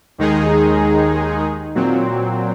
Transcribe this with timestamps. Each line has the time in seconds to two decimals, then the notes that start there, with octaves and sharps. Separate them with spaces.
0.18 D#2 D#3 G#3 D#4 G#4
1.75 A#2 F#3 C4